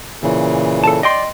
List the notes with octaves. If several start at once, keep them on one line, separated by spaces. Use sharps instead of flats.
A#2 C#3 E3
A4 A5
D5 D#5 G5 C6